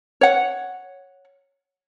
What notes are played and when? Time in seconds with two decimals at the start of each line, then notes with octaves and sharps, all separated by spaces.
0.21 C#5 F#5